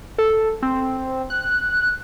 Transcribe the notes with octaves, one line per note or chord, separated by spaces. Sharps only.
A4
C4
F#6